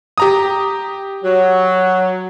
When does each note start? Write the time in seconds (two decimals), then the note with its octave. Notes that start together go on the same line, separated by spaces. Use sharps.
0.18 G4 A#5 D#6
1.24 F#3